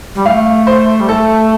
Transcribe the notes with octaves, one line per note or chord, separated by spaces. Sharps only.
G3
A3 F5
C5
G3
A3 A4